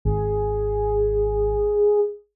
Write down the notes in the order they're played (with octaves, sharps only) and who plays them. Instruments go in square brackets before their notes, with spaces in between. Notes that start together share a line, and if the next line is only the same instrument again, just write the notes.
[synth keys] G#1 [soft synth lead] G#4